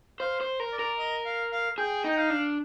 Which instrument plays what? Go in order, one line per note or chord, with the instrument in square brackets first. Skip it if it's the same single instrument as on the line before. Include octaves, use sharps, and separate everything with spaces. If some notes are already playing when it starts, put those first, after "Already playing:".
[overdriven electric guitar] C5 [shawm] F5
[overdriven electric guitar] C5
A#4
[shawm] D5
[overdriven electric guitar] A#4
[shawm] D#5
F5
F5
[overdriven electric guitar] G#4 [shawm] G5
[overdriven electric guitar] D#4
[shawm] G5
F5
[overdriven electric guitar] D4